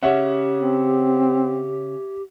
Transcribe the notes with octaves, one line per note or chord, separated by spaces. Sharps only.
C#3 C#4 G4 C#5 E5 F#5
C4